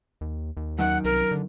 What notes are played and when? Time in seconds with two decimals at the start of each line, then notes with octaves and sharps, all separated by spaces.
0.21 D#2
0.57 D#2
0.79 F#2 D#3 F#5
1.04 C2 A#4
1.31 D3